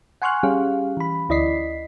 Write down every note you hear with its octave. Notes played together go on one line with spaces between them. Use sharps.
F#5 G#5 C6 C#6 F6 F#6
G3 C#4 G4 G#4 F5
E3 B5
D2 E4 D5 D#5 B6 C7